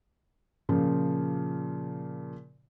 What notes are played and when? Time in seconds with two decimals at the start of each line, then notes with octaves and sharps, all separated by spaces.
0.69 A#2 C#3 F3